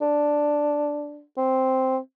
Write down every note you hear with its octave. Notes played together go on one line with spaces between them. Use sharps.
D4
C4